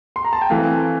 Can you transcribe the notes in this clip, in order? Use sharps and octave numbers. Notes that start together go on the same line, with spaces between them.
C6
A#5
A5
G5
E3 A3 C4 F5